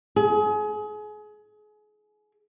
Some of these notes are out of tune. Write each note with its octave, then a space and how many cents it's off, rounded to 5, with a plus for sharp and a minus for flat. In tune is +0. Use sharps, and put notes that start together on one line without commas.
G#4 +30